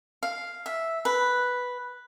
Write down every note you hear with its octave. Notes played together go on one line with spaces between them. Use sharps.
F5
E5
B4